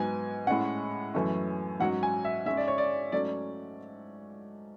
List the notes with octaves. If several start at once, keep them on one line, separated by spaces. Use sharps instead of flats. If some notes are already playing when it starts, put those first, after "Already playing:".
Already playing: G#2 F#3 B3 G#5
A2 G#3 C#4 F#5
F#2 E3 A3 C#4
G#2 F#3 C#4 F#5
G#5
E5
G#2 G#3 C#4 E5
D5
C#5
D5
G#2 F#3 A3 C#4 D5